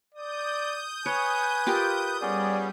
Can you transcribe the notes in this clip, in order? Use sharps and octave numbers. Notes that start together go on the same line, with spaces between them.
D5 D#6 G6
B4 C#5 G#5
F4 G4 A#4
G3 B3 C#4 G#4 D5